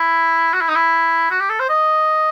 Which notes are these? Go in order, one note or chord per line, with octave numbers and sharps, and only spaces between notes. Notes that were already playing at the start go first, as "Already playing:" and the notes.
Already playing: E4
F#4
E4
D#4
E4
F#4
G4
A4
C5
D#5